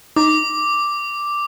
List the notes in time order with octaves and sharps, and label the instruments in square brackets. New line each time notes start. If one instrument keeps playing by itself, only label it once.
[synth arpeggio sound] D#4 [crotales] D6